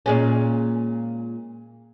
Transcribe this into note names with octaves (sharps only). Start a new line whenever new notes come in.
A#2 G#3 C#4